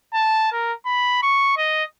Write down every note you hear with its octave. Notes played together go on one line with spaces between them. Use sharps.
A5
A#4
B5
C#6
D#5